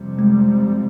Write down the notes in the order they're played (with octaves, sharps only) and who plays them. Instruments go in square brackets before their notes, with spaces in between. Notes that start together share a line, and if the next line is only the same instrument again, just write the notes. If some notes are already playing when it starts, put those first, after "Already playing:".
Already playing: [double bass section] F2 C3 G3 C4
[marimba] G#3